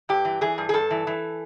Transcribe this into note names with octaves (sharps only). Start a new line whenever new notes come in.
G2 G4
E3
E3 G#4
G2
G#4
G2 A4
E3
E3